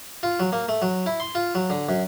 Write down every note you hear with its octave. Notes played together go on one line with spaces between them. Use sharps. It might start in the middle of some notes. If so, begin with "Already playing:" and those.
F4
F#3
A#3
A3
F#3
E4
C6
F4
F#3
D3
F#2